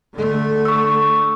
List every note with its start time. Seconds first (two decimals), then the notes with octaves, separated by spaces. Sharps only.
0.13 D3 A3
0.65 C#6 E6